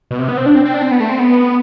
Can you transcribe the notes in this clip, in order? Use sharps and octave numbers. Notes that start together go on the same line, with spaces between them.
B2
C3
B3
C4
D4
C4
C4
D4
C4
B3
A3
C4
B3